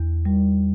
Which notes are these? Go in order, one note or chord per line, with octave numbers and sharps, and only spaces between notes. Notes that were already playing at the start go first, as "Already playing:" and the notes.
Already playing: E2
G3